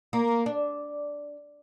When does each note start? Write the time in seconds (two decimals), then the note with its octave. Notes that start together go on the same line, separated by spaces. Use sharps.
0.13 A#3
0.46 D4